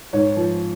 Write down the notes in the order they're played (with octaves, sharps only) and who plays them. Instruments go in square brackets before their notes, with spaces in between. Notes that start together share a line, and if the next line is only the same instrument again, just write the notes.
[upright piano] G#2 C#5
F3